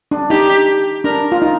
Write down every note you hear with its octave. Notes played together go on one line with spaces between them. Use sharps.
D4
D#4 G4
D4 A#4
F4
D#4